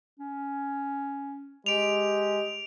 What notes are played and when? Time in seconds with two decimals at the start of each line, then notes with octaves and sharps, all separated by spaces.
0.19 C#4
1.66 G#3 G4 D7 F7